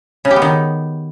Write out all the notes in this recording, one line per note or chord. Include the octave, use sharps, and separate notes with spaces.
C#3
G4
B3
D#3